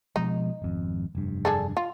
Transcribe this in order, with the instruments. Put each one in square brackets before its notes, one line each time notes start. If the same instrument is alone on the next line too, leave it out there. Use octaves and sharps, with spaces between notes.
[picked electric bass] B2 F3 G#3 [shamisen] D#4
[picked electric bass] G#1 F2
F1 G2
[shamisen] D4 G#4 A4
F4